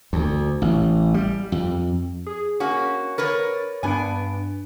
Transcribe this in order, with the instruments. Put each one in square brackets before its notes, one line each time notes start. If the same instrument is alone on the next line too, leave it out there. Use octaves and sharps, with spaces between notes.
[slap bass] D2
A1
G3
F2
[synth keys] G#4
[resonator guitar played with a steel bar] A#3 C#4 F#4
[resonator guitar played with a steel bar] A#4 B4 C#5 [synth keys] A6
[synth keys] G2 D4 D7 [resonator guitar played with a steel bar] B3 G#5